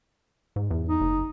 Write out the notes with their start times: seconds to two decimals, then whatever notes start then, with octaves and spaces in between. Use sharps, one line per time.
0.56 G#2
0.70 E2
0.89 D#4
1.01 F#1